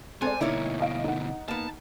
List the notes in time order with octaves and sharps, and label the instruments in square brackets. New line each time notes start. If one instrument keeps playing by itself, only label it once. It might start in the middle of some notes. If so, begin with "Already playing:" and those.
[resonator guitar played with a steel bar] G#3 A4 [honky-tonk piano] C4 D5 [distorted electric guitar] G#5
[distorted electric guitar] D2 B2 [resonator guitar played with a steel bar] A#3 E4 C#5 [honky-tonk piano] D#4
[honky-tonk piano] D#5 F5 D7
D#4 F#5
[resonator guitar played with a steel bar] A#3 B3 [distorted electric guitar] A5